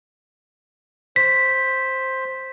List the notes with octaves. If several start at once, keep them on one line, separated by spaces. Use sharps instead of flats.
C5 B6